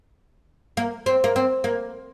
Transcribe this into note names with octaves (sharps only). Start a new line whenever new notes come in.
A#3
C4
A#3
C4
A#3